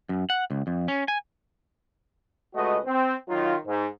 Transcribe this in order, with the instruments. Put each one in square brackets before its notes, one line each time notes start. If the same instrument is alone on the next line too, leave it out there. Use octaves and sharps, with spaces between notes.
[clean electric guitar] F#2
F#5
C#2
F2
C#4
G#5
[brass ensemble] C#2 G#3 A3 F#4 B4 D#5
C4
D#3 F#3 D#4 F4
G#2